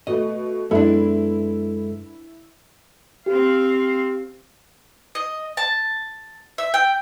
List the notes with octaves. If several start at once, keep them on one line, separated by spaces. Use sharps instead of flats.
B2 A3 D#5
F#2 G#3 B3 D4 E4 A4
C4 G4 F5
D#5
A5
E5
G5